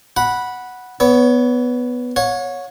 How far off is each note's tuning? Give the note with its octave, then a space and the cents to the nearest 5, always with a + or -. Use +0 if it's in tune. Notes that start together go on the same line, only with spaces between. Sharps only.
F#5 +0 B5 -10
B3 +0 C#5 +25
C#5 +0 F#5 -40